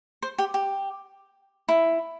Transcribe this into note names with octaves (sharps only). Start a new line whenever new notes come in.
C5
G4
G4
E4